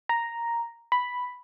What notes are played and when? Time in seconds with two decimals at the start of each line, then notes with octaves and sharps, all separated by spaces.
0.09 A#5
0.92 B5